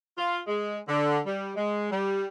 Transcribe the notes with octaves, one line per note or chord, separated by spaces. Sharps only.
F4
G#3
D3
G3
G#3
G3